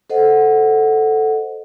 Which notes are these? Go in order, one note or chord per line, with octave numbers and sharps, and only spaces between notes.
A4 C5 D#5 F#5